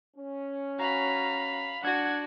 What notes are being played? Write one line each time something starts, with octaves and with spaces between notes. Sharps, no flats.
C#4
F#4 F5 A#5 B5
D4 F#4 F#5 G#6